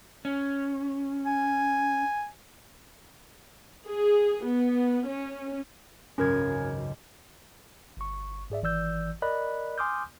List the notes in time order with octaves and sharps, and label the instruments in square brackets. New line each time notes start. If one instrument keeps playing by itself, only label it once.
[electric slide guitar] C#4
[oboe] G#5
[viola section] G#4
B3
C#4
[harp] G#1 C#2 F#2 [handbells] C#4 A#4 G#6
[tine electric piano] G1 C#6
G#2 G#4 D5 E5
G#1 E3 D5 E6 G6
A#4 D5 D#5 B5 F#6
G#5 C6 D6 D#6 F6 G6